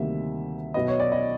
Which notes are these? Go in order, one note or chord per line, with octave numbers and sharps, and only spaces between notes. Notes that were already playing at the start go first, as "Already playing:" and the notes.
Already playing: D2 C3 D#3 G3 A#3 E5
B1 B2 F#3 B3 D#5
C#5
D5
D#5